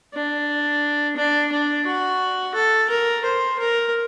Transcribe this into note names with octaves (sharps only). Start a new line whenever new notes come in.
D4
D4
D4
F#4
A4
A#4
C5
A#4